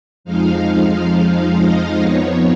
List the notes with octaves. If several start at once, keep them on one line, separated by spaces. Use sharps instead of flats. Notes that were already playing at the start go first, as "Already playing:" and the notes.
F2 F3 G#3 D#4 F5
D#5
F2 F3 B3 D#4 C#5